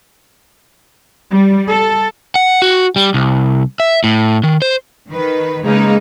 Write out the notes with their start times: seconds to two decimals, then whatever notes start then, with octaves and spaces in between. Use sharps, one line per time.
1.30 G3
1.70 A4
2.35 F#5
2.62 F#4
2.96 G3
3.14 C2
3.80 E5
4.04 A2
4.44 D#3
4.62 C5
5.11 D#3 B4
5.66 C#3 G#3 A#3 D#4 B4